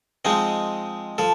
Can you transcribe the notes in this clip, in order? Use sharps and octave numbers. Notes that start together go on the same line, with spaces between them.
F3 G#3 C4 D#4
F3 A4